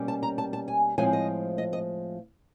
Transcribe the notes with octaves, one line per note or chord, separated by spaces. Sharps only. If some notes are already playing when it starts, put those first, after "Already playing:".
Already playing: B2 G3 A#3 C#4
A5
A#5
A5
A5
G#5
A2 F3 G#3 C4 F4 G#5
D#5
D#5
D#5